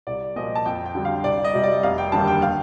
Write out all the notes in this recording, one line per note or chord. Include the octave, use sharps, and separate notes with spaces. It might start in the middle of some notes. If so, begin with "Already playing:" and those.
C2 D5
A#2 F3 D#5
A5
F2 G5
G5
D3 G3
F5
C2 D5
D#5
C3 G3
D5
F1 F5
G5
D#2 D3 G3 A5
G5
F5